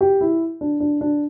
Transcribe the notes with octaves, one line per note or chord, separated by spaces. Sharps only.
G4
E4
D4
D4
D4